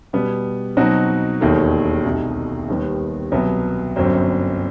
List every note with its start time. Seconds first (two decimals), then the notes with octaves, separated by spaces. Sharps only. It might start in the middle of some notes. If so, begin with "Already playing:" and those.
0.13 B2 G3 B3
0.77 B2 F#3 C4 D#4 F#4
1.41 E1 D#2 D#3 A3
2.04 C2 B2 A3 D#4
2.68 D#2 D#3 G3 B3
3.32 C2 B2 F#3 B3
3.96 G1 F#2 F#3 C4